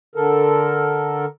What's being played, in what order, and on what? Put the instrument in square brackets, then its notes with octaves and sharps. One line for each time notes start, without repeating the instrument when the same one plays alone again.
[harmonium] D3 A4 A#4